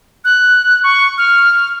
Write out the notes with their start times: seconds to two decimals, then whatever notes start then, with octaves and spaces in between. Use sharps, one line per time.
0.25 F#6
0.84 C#6
1.18 F6